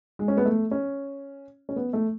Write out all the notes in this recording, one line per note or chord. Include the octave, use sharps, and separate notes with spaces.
G#3
C#4
B3
A3
C#4
C#4
B3
A3